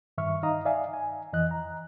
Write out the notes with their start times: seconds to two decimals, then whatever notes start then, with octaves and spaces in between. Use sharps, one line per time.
0.18 G2 D#3 E5 C#6 F6
0.43 D#4 D#5 F5 A#5 D#6
0.65 D5 E5 F5 G#5
0.93 G#5
1.33 F2 E3 D#5 F#6
1.51 A#5